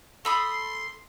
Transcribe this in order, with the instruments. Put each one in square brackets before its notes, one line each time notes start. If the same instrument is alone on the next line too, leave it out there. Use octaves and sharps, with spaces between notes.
[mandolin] A4 B5 D#6 [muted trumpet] C6